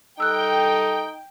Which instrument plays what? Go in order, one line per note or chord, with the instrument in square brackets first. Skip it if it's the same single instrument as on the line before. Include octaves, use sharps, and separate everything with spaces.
[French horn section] G3 A4 [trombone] D#4 [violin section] G5 [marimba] E6 F#6